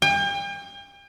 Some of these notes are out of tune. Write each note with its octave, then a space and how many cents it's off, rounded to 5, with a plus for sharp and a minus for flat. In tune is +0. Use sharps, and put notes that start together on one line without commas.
G5 +40